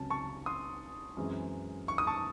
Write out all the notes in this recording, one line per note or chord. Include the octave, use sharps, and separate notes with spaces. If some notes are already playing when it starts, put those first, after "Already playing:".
Already playing: C#2 C3 F#3 C#4 A5
A5 C#6
C6 D#6
F#2 E3 G#3 C4
C#6
D#6
A5 C#6